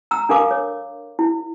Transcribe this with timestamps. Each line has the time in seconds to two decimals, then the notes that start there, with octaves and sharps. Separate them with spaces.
0.11 A#5 E6
0.29 D4 A4 A#4 F5 D6
0.51 C#5
1.19 E4